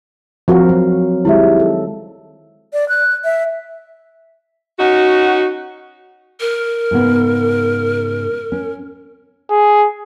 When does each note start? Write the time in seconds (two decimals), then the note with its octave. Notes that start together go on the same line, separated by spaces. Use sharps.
0.48 F3 C4 F#4 A#4 F5
0.69 F#3
1.25 D#3 G3 G#3 E4 G4 E5
1.59 A4
2.73 D5
2.89 F#6
3.24 E5
4.78 C#4 D#4 F#4
6.40 A#4
6.91 G#2 C#3 B3
8.52 C#4
9.51 G#4